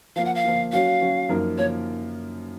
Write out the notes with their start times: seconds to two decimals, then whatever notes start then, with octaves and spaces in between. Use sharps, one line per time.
0.16 F3 A#3 F4 F5
0.25 F#5
0.35 F5
0.44 F3 A#3 F4
0.72 F#3 C#4 F#4 F5
1.01 F#3 C#4 F#4
1.29 F#2 F3 A#3 D#4 A#4
1.58 F3 A#3 C#5